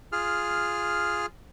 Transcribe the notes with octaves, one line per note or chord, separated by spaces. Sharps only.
F4 G#4 F6